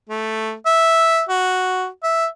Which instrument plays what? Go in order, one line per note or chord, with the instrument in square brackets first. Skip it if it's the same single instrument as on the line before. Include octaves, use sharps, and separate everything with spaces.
[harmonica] A3
E5
F#4
E5